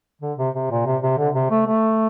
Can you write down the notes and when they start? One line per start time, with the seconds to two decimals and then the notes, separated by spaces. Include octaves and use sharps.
0.22 D3
0.38 C3
0.55 C3
0.71 A#2
0.86 C3
1.02 C3
1.18 D3
1.34 C3
1.51 A3
1.66 A3